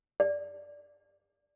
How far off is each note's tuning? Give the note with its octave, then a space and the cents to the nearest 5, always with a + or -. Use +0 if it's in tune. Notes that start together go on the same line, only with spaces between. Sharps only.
D5 -5